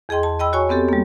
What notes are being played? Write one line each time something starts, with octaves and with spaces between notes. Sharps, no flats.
E2 G#4 D#5 G5 C6
A5
D#5 G5 B5 E6
F#4 C#5 G#5 C#6
B3 C4 G4 A4
G3 A#3